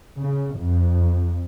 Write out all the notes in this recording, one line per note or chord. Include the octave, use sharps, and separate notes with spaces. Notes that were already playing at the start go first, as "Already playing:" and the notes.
C#3
F2